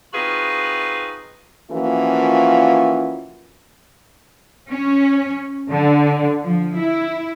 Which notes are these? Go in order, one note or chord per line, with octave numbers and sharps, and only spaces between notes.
C4 D#4 F4 F#4 G#4 B4
E3 F3 A#3 C#4 F4 F#4
C#4
D3
F3
E4